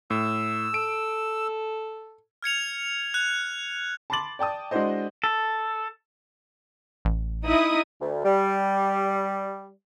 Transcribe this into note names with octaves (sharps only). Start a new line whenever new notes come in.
A2 E6
A4 D7
F6 G#6 C#7 F7
F#6 F7
A5 B5 C6 D6 A6 F#7
D5 G5 A5 D#6
G#3 D4 E4 F#4 C5 D#5
A4
A1
D#4 E4 D#6
D2
G3